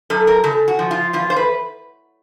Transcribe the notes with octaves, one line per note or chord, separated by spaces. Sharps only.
F#2 A4
A#4
C#3 A4
F#4
F3
F4
E2 F4
C5
B4